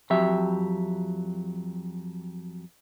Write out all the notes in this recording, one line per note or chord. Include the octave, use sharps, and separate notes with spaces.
F2 F#3 G4 E5